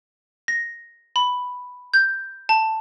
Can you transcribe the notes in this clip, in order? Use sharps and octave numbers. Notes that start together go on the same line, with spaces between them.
A#6
B5
G6
A5